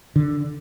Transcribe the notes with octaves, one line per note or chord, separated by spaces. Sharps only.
D3